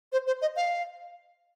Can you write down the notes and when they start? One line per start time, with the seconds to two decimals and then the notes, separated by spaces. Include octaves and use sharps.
0.13 C5
0.27 C5
0.42 D#5
0.56 F5